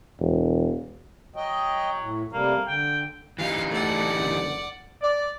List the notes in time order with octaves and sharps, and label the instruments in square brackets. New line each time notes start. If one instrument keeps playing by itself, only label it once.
[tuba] E1
[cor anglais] F#3 [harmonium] D#5 G5
[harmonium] A2
[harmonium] C3 G3 A3 [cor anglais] A#3
[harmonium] D3 [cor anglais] G5
[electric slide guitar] E3 G3 D#4 [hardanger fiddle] F5
[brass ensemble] A3 A4 [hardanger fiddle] D5 F#5
[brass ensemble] F#1 D3
[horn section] D5